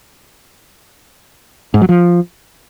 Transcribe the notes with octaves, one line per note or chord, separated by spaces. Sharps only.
G#2
F#3
F3